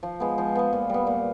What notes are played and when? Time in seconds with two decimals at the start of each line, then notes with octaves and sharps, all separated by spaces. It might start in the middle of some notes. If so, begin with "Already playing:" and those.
0.03 F3
0.20 G#3 B3
0.38 F3
0.55 G#3 B3
0.73 A#2
0.89 G3 B3
1.07 A#2